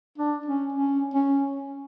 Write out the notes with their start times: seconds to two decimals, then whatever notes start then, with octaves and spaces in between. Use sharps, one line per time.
0.18 D4
0.46 C#4
0.73 C#4
1.14 C#4